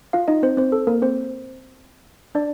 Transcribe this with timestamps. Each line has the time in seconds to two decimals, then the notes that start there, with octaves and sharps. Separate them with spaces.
0.13 F4 F5
0.28 D#4 D#5
0.43 C4 C5
0.57 C4 C5
0.72 A4
0.87 A#3 A#4
1.02 C4 C5
2.35 D4 D5